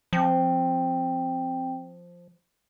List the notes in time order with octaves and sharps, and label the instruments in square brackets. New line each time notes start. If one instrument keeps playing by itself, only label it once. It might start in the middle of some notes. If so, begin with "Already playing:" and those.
[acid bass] F3 [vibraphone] C4 G5